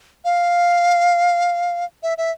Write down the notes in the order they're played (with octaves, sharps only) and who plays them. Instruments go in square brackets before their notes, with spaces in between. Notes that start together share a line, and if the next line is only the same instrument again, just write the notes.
[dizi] F5
E5
E5